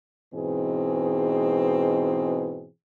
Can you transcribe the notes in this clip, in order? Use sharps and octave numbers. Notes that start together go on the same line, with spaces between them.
G#2 B2 E3 C4 G#4